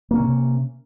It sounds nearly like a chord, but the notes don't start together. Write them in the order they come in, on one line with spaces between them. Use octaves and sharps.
A#3 C#4 C3